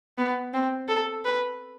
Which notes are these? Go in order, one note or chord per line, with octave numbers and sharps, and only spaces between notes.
B3
C4
A4
B4